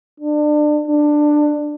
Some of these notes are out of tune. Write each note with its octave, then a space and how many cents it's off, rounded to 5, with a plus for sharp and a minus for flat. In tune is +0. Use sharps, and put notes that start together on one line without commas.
D4 +30
D4 +15